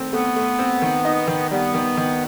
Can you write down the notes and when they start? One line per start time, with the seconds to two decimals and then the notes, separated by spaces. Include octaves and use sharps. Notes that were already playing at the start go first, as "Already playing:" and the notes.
Already playing: D#3 A3 C4
0.12 A3 B3
0.36 A3
0.59 C4
0.82 D#3
1.05 D#4
1.28 D#3
1.51 G3 B3
1.74 D#3
1.97 D#3